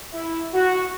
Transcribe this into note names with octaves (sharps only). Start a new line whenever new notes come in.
E4
F#4